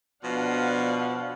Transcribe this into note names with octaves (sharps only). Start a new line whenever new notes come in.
B2 F3 D4 F5 F#5